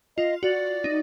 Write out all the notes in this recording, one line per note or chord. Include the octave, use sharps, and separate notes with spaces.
F4 D#5
F#4 D5
D#4